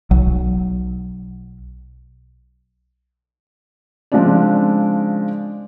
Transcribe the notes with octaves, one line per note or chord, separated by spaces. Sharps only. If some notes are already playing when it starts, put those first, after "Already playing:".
B1 F#3
C#3 F3 G#3 C4 D4 D5